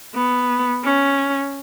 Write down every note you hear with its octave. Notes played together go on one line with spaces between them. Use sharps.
B3
C#4